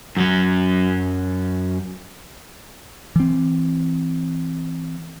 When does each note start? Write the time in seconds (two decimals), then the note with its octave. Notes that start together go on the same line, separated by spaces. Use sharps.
0.17 F#2 F#3
3.16 E3 C4